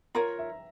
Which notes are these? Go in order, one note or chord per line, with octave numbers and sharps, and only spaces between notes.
F4 A#4 C#5 A#5
E5